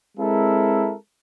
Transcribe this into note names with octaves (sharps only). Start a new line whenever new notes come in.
G#3 C4 E4 A4 A#4